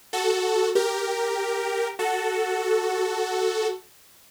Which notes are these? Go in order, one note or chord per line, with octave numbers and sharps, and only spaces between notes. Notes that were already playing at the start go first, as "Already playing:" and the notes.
F#4 A4
G4 A#4
F#4 A4